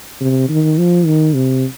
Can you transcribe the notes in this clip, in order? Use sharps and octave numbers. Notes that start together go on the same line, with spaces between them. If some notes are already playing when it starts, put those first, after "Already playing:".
C3
D#3
F3
D#3
C3